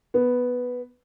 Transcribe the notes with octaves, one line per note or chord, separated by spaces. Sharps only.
B3